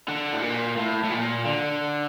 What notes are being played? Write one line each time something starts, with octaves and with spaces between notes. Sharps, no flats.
D3
A2
A#2
A2
A2
A#2
D3